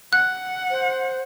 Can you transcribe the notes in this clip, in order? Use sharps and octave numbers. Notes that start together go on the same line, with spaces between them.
F#5 F#6
C5